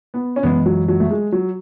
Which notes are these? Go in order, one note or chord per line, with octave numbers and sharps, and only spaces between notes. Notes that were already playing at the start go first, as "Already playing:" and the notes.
B3
C#4
F#2 E3 G#3 B3
F#3
F#3
A3
G#3
F#3